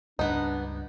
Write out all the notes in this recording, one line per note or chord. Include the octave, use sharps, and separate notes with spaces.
C#2 G2 B3 D4 D#4